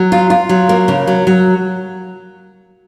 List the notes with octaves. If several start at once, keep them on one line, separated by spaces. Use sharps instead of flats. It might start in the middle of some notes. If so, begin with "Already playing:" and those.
Already playing: F#3
F4
F4
F#3
A#3
C#3
F#3
F#3